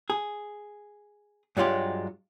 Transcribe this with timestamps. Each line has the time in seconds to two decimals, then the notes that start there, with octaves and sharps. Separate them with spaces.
0.10 G#4
1.57 G2 F#3 G#3 F4 G4